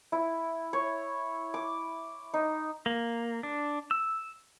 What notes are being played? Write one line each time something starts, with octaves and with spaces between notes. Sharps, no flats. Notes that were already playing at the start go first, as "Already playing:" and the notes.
E4
C#5
D6
D#4
A#3
D4
E6